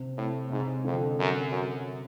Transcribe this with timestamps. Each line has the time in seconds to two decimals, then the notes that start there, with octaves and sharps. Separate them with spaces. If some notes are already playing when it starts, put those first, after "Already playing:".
Already playing: C3
0.18 A2
0.50 G#2 C3
0.84 F2 D3
1.19 F#2
1.52 F#2